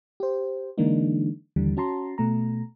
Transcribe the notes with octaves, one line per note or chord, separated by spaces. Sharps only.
G4 C5
D3 E3 G#3 A#3 D4 D#4
D#2 D3 E3 G3
C#4 F#4 A5 A#5 C6
B2 A3 A#5